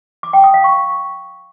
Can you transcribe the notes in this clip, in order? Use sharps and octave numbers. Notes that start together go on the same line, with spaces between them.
D6
G5
D#6
F5
C#6